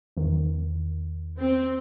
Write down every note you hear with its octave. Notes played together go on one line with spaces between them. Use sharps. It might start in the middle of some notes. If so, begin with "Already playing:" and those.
E2 D#3
C4